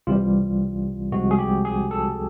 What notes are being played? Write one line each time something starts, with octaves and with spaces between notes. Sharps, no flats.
C2 C3 E3 G3 F4
C2 C3 F3 G#3 F#4
G#4
G4
G#4
A4